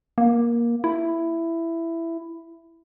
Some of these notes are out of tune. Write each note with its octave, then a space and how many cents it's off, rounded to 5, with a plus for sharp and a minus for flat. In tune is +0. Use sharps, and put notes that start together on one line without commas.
A#3 +15
E4 +10